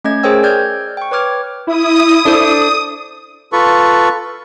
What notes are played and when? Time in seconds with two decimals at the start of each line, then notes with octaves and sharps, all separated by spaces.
0.05 A3 C#4 D#5 G#6
0.23 G#4 A#4 C5 C#5 G5 E6
0.43 D5 F6 G6 G#6
0.97 G5 C#6
1.11 B4 C#5 D6 F6 G#6
1.67 E4 D#6
2.25 D4 A4 C5
3.53 F4 A4 B4 C#6